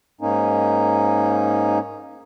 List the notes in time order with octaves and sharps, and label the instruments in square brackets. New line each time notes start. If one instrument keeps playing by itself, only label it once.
[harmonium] G#2 A#3 C#4 D#4